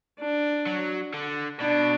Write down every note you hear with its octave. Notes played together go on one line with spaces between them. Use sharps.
D4
F#3
D3
B2 D4